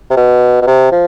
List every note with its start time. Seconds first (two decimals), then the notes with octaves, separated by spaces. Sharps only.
0.10 C3
0.17 B2
0.61 B2
0.67 C3
0.92 F3